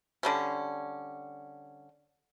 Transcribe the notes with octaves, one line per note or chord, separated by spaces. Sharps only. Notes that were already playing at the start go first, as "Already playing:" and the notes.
D3 G3 C#4